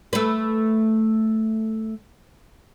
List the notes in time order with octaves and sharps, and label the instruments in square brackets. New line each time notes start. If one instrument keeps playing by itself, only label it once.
[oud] A3 B4